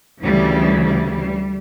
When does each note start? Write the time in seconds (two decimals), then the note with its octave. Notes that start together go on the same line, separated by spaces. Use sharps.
0.22 D2 C#3 E3 G3
0.84 G3